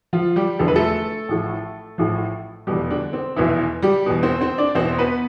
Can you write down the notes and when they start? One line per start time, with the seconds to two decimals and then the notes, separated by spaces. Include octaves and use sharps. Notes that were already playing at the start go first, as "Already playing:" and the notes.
0.13 F3 F4
0.36 G3 G4
0.59 E1 E2 D3 F3 A4
0.68 B4
0.76 A3 A4
1.29 A1 A2 F3
1.98 A1 A2 F3
2.67 F1 E2 B2 G3 G4
2.91 D3 D4
3.13 C4
3.36 F1 E2 B2 E3 E4
3.82 G3 G4
4.06 E2 B2
4.23 C4 C5
4.41 C4 C5
4.58 D4 D5
4.75 E2 B2 C4 C5
4.98 B3 B4